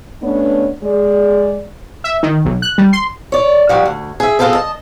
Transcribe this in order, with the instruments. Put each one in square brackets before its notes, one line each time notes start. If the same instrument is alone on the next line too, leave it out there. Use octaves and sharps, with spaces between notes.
[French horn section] A3 B3 C#4 D4 B4 C#5
G#3 D5
[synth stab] E5
D#3
B1
F#6
G3
C6
[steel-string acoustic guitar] C#5 D5
F3 G3 F#4
D2
G#4 E5
B3 C4 F4 G#4 A4 B4
D#5 A5